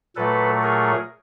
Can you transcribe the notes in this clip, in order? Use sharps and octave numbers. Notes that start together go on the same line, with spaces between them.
A#2 F#3 A3 A4 B4
G#4 A#4